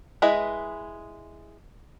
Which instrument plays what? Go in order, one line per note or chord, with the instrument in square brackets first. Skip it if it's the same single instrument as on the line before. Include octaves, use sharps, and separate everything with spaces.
[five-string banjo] G#3 E4 G#4 B4 D#5